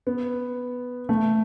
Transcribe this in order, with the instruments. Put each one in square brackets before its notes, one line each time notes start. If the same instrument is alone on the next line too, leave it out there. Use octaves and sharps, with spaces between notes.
[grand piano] B3
A3